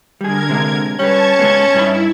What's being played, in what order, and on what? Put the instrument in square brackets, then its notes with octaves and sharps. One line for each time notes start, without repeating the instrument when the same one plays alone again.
[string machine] D3 A#4 G#6 [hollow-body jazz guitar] G3 G#4
[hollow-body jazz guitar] C3 G#3
[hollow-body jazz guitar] G3 B4 [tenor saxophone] C#4 [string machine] A5 C#6 G#6
[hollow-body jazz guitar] C#3 G#3 B3
[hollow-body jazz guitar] G2 D#4 B5 [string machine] E4